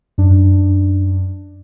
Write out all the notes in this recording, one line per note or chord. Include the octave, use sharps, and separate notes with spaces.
F#2 D4